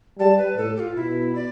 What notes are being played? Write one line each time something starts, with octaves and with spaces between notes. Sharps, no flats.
G3 A5
B4
A2 A4
G4
F4
B2 E4
D5